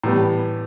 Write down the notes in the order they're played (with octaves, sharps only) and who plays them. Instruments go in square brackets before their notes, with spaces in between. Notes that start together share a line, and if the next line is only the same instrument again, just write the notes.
[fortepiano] A2 E3 G3 B3